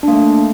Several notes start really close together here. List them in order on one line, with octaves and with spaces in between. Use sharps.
D4 A#3 A3